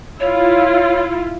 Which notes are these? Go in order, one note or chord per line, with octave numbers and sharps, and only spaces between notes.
E4 F4 C#5